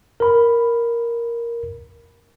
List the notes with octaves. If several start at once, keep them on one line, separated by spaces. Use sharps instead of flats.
A#4 B5